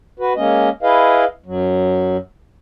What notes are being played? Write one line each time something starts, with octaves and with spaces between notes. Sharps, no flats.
F#4 B4
G#3 A#3 C#4 D#5
E4 G#4 B4 D#5 F5
F#2 F#3